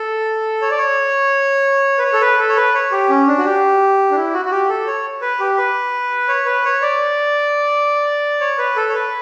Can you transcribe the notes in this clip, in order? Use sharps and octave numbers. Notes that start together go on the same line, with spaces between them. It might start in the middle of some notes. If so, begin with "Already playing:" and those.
Already playing: A4
C#5
D5
C#5
B4
C#5
A4
B4
A4
C#5
B4
C#5
G4
C#4
D4
F#4
G4
D4
E4
F#4
F#4
G4
A4
C#5
B4
G4
B4
C#5
B4
C#5
D5
C#5
B4
A4
C#5
B4